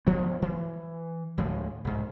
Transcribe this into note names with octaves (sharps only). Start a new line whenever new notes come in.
D2 F3 B3
E3
D2 A2 F3 G#3
C2 G#2